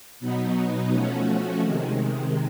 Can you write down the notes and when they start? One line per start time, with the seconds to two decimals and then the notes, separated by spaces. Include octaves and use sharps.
0.20 B2 F#3 B3 D#4
0.91 F3 A3 C#4 F#4
1.61 C3 D#3 G#3